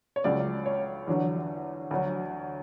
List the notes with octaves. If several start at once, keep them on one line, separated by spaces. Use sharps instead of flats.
C#5
C#2 C#3 F#3 D5
C#5
E2 D3 F#3
D2 D3 F#3